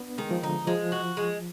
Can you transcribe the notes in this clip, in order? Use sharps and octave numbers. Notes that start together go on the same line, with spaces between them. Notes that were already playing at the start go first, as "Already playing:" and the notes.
Already playing: B3 D4
D#3 G#3
F3
D3 D#4
F3 G#3
F#4
G#3